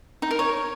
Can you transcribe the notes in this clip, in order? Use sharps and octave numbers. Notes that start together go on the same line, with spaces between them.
D#4
A#4
C#5